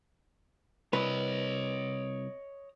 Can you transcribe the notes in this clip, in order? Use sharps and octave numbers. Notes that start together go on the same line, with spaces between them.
C2 B4 C#5 D#5